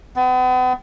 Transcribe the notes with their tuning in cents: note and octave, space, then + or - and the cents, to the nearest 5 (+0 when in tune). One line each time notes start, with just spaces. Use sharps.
B3 +40